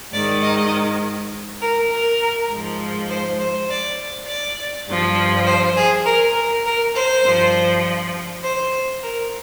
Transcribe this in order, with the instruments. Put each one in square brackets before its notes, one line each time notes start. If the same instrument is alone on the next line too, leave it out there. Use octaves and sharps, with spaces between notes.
[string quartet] G#2 D#3 D5
D#5
A#4
A#4
G#2 F3
C5
C5
D5
D5
G2 F3
C5
G#4
A#4
A#4
A#4
C5
G2 F3
C5
A#4